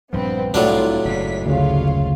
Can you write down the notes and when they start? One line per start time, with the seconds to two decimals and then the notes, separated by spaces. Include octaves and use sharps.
0.13 A#1 G2 F3 B3 C4 B4
0.54 C2 A2 F#3 D4 F4 D5
1.05 F#1 G#2 B6
1.46 D2 C#3 F4 C#5 F5